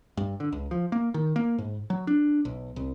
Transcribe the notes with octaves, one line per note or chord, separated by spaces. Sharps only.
G2
D3
C#2
F3
A#3
D#3
A#3
G#2
F#3
D4
B1
C2